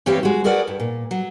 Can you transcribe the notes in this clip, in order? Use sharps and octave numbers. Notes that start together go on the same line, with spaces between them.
G2 E3 C4 G4 C#5 F5
G#3 F#4
F#4 G#4 A#4 B4 D5 F#5
G2
A#2
F#3